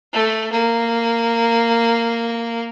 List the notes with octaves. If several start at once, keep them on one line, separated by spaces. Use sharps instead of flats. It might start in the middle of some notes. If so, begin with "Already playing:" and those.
A3
A#3